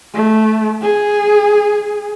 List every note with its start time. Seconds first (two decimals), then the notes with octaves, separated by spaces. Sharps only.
0.14 A3
0.82 G#4